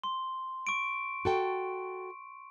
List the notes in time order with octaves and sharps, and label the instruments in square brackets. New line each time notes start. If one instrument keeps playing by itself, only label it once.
[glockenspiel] C6
C#6 D7
[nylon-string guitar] F#4 A4 G5